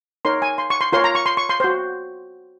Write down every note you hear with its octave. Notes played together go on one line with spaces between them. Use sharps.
D#4 A#4 C#5 C6
G#5
C6
C#6
C6
F4 A#4 C#5 C6
A#5
C#6
C6
C#6
C6
F#4 C5